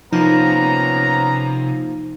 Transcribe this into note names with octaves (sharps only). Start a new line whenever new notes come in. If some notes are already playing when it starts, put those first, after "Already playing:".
C3 F3 A#3 B3 C#4 D#4 A#5